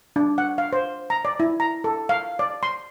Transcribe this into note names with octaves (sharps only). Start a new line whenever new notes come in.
D4
F#5
F5
C5
A#5
D5
E4
A#5
A4
F5
D5
C6